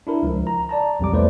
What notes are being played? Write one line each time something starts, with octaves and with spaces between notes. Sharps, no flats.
D4 E4 A#4
C#2 F3
A#5
D5 A5 A#5
B1 F2 G3 D6
E2 E3 A3 B4 C5 D5